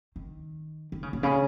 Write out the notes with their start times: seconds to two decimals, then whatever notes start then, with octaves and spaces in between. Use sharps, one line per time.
0.16 D#3
0.92 D#3
1.03 C#3
1.13 A#2
1.23 C#3